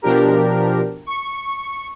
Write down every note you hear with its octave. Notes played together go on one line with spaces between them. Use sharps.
B2 F3 D4 G4 A#4
C#6